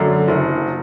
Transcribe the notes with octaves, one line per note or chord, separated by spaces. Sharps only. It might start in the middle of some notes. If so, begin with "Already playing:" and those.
Already playing: F#2 D3
F#1